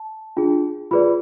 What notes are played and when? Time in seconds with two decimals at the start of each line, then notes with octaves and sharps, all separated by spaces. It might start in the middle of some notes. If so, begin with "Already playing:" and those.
Already playing: A5
0.37 D4 F4 G#4
0.91 F4 G#4 B4 D5 B5